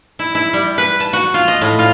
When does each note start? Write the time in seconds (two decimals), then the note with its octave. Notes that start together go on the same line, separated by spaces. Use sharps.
0.19 E4
0.35 E4
0.53 G3
0.78 B4
1.00 A5
1.13 F#4
1.34 F4
1.48 D#5
1.61 A2
1.79 F4